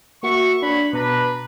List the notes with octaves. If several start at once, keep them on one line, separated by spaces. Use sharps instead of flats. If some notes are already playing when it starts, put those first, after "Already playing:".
A#3 F#4 E5 C#6
D4 C#5 F#5 B5
B2 D4 B4 A#5